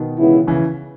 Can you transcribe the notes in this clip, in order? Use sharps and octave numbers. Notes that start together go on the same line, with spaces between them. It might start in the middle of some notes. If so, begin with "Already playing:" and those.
Already playing: B2 D#3
C#2 C#3 E3 B3 E4
C#3 E3